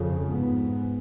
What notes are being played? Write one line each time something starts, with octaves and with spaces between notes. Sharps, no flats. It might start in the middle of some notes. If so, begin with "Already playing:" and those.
Already playing: F2 C#3
G#2 B3